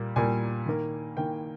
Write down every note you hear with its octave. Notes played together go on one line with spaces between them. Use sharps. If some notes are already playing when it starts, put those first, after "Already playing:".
Already playing: A#2 G3 A#3
A#2 G3 A#3 G#5
D#3 A#3
D#3 A#3 G5